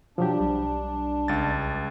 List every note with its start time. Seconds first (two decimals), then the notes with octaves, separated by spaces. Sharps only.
0.18 B2 F3 F#3 D4 G4
0.40 B1 G3
1.28 C#2 A6